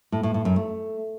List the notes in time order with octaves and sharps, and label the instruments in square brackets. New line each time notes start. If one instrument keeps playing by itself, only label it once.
[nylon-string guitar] A2
A2
A2
F#2
A3